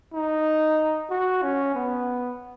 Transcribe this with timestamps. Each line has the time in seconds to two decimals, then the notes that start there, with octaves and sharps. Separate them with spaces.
0.14 D#4
1.10 F#4
1.43 C#4
1.75 B3